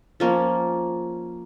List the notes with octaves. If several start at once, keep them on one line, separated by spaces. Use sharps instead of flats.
F3 A#3 C#4